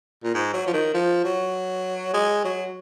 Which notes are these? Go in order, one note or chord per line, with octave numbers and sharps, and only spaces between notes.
A#2
G#2
F#3
F3
D#3
F3
F#3
G#3
F#3